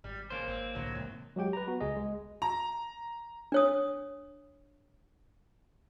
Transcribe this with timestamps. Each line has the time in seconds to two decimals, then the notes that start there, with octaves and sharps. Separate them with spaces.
0.04 G#1 G3
0.30 C#3 A#3 C5
0.48 G#1 C4
0.75 C2 A2 D3 F#3
0.95 E2 G#2 C3
1.36 F#3 G#3 G4 G5
1.53 B4 A#5
1.68 B3 F#4
1.80 C#2 G#4 D#5
1.97 G#3
2.42 A#5
3.52 D4 C#5 D#6